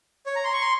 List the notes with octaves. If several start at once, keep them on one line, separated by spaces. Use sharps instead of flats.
C#5
A#5
C6
C#6
C6